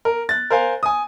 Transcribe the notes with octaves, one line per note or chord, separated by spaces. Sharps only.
A#4
F#6 A6
A#4 C5 F5 G#5
G#5 D#6